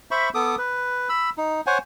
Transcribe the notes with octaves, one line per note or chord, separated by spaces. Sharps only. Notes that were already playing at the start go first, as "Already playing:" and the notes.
C5 E5 B5 C#6
B3 A4 D6 D#6
B4
B5 E6
D#4
C5 C#5 F#5 G#5